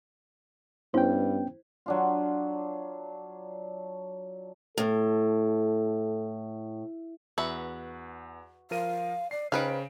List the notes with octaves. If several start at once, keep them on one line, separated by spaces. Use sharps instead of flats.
G2 B3 C#4 E4 C5 G5
F#3 D4 F4
A2 A4
E2 F#4 B4 E5
F3 A#4 F5 D#7
D5 C7
C#3 D#4 B4 C5 F5 G5 D7